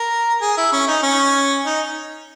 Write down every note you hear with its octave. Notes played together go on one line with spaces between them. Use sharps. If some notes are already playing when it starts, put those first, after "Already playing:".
Already playing: A#4
G#4
E4
C#4
D#4
C#4
D#4